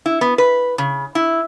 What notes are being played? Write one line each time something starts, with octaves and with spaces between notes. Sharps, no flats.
E4
B3
B4
C#3
E4